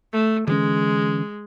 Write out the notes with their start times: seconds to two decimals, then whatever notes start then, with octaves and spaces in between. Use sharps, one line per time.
0.13 A3
0.47 D3 E3 G#3 C#4